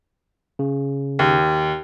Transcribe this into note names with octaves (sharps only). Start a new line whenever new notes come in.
C#3
D#2